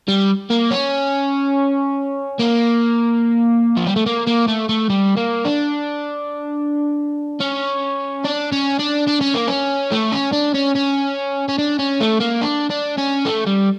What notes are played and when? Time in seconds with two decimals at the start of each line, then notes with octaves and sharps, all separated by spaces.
0.08 G3
0.50 A#3
0.71 C#4
2.39 A#3
3.77 F3
3.87 G3
3.96 A3
4.06 A#3
4.27 A#3
4.48 A3
4.69 A3
4.90 G3
5.17 A#3
5.45 D4
7.41 C#4
8.24 D4
8.52 C#4
8.79 D4
9.08 D4
9.21 C#4
9.35 A#3
9.48 C#4
9.92 A3
10.12 C#4
10.32 D4
10.54 C#4
10.75 C#4
11.48 C#4
11.58 D4
11.79 C#4
12.01 A3
12.21 A#3
12.42 D4
12.70 D4
12.98 C#4
13.26 A3
13.47 G3